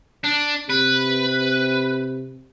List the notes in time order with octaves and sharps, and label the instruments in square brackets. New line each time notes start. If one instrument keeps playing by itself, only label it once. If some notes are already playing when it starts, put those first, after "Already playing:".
[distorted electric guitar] D4
[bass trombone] C3 [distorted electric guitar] B4